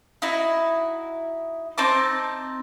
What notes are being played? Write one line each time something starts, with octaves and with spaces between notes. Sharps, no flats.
D#4 E4 F#4
C4 D#4 A5 D6